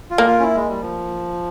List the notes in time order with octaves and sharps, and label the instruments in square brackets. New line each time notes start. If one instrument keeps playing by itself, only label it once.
[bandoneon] F4
[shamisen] A#3
[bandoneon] F4
C#4
E4
G#3
G3
F3